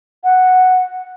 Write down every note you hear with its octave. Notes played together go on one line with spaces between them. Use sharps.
F#5